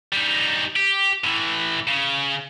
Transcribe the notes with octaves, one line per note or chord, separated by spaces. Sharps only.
G3 D#4
G4
A2 E3
C#3